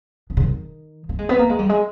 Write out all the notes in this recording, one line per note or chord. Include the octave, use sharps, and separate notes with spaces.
D#3
C#3
D#3
A#3
G#3
B3
A#3
G#3
G3
G#3